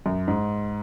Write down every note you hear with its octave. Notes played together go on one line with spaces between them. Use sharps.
F#2
G#2